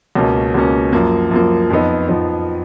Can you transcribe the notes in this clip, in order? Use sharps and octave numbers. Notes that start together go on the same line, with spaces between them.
C#2 B2 A#3 C#4
C#2 B2 A#3 C#4
F#2 F3 A#3
F#2 F3 A#3
F2 F3 B3 D#4
F2 F3 B3 D#4